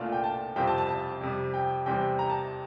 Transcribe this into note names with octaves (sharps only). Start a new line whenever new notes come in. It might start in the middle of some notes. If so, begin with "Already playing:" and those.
Already playing: C2 A#2 A3 D4 F4
G5
A5
F2 C3 G3 C4 F4 G5
A5
A5
A5
F2 C3 G3
G5
E2 C3 G3 C4 G5
A#5
A5